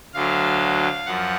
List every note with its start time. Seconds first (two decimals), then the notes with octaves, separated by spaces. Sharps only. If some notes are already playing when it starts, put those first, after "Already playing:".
0.14 D2 D3 F#3 F5
1.06 F#2 F3 F#5